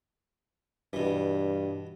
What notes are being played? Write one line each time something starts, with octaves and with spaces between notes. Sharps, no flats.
G2 B2 E3